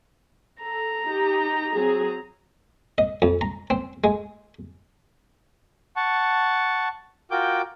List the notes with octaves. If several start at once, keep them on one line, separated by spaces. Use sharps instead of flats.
A4 A#5
D#4 G4
F#3 C4 G#4
D#5
F2
A#5
C4
G#3
F#5 A5 C#6
F4 F#4 A#4 G5 D6 G6